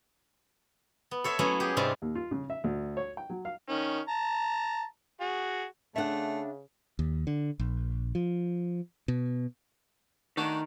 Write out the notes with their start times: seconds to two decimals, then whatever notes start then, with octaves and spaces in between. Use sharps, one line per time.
1.11 B3
1.24 A4 C#5 E5 C6
1.39 F#3 A3 B3 C#4 E4
1.60 G4 G#4
1.77 G#2 C3 G3 C4 F4
2.02 D#2
2.15 F4
2.31 C#3
2.50 E5
2.64 D2
2.97 C#5
3.17 G5
3.30 F#3
3.45 F5
3.68 D#3 C#4
4.08 A5 A#5
5.21 F#4 G#4
5.96 C#3 A3 D4 E5 F#5
6.99 D#2
7.27 D3
7.59 A#1
8.15 F3
9.08 B2
10.37 D#3 A3 D4 F#4